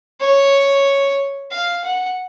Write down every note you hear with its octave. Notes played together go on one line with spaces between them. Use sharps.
C#5
F5
F#5